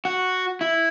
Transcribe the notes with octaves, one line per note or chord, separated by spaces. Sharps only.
F#4
E4